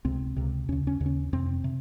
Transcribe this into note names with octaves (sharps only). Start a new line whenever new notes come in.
C#2 C3 C4
C#2 C3
D#2 C#3 C#4
C#4
D#2 C#3
C#4
F2 C3 C4
C3